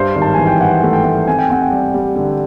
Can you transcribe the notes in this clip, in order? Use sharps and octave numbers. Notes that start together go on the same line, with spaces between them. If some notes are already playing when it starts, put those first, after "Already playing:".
Already playing: G2 C5
G#1
A5
E3 G#5
G5
E3 F#5
A3
G5
A3
C4 G#5
G5
C4 F#5
G5
G3
G3
D3